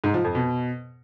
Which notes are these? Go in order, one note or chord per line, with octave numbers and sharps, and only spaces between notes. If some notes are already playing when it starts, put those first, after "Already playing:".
G#2
F3
F2
B2